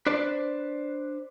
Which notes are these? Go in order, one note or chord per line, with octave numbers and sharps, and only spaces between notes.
D4 B4 C5 D5